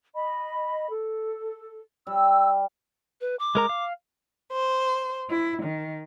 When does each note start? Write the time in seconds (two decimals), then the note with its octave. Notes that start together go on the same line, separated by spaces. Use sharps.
0.14 D#5 B5
0.90 A4
2.07 G3 E6
3.21 B4
3.39 D6
3.55 G#3 A#4 A#5
3.69 F5
4.52 C5
5.30 E4
5.64 D#3